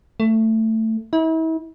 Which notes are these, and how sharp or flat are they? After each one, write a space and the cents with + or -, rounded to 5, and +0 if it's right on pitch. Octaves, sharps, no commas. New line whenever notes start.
A3 +15
E4 -40